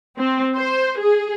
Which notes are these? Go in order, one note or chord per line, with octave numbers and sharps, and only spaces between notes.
C4
C5
G#4